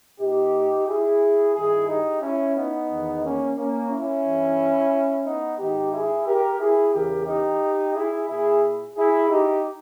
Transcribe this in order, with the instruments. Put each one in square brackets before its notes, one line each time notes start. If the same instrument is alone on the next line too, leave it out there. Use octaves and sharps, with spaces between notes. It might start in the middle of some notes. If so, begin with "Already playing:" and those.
[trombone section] A#2 D#4 G4
E4 G#4
G2 D#3 E4 G#4
D#4 G4
C#4 E4
B3 D#4
E2 D#3
A#3 C#4
A#3 C#4
C#4 E4
G2 E3
B3 D#4
G#2 D#3 D#4 G4
E4 G#4
G4 A#4
E4 G#4
E2 C#3 E3 G4 A#4
D#4 G4
E4 G#4
A#2 E4 G#4
E4 G#4
D#4 G4